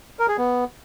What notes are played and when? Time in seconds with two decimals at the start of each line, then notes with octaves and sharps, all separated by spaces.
0.19 A#4
0.29 G#4
0.38 B3